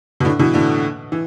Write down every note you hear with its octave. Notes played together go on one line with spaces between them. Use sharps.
B2
A2 D3
B2 E3
A2 D3
E3